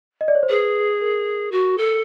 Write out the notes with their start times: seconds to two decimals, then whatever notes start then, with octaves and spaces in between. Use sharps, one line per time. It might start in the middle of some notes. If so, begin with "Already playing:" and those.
0.21 D#5
0.28 D5
0.35 C#5
0.43 C5
0.49 G#4 B4
1.01 A#4
1.52 F#4
1.78 A4